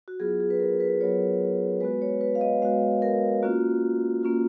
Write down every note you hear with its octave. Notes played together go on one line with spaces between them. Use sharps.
F#4
F#3 B3 F4 G#4
G#4
B4
A#4
B4
F#3 B3 F4 C#5
G#3 B3 F#4 B4
C#5
B4
F5
D#5
G#3 B3 F#4 F5
A#4
A#3 C#4 F4 F#4
A#3 C#4 F4